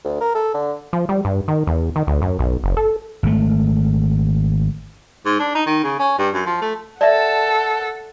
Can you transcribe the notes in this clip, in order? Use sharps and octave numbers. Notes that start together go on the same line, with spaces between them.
D2
A#4
A4
D3
F3
G3
G2
D#3
E2
D#3
D2
F#2
B1
F#1
A4
G#1 A3
G#2
D4
D#4
D#3
C#3
C#4
G2
F#2
F3
A3
A4 D5 E5 F#5 A5